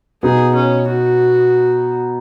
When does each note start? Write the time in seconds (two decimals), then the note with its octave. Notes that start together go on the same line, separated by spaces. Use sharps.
0.23 B2 B3 D#4 G#4
0.55 C#4
0.87 F#4